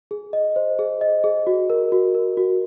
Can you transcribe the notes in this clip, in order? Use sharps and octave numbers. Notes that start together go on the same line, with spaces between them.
G#4
D#5
C5
G#4
D#5
G#4
F#4
A#4
F#4
A#4
F#4